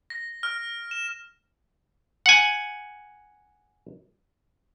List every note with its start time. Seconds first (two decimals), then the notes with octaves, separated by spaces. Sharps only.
0.10 A#6
0.43 F6
0.91 E7
2.26 F#5 G#5